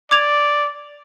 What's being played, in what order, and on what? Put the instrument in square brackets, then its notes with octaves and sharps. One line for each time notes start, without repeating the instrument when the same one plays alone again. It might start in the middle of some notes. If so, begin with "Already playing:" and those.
[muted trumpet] D5 [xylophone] D6 G#6 F7